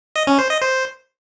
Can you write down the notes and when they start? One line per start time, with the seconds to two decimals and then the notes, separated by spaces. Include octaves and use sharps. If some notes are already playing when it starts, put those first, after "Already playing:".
0.16 D#5
0.27 C#4
0.39 C5
0.50 D#5
0.62 C5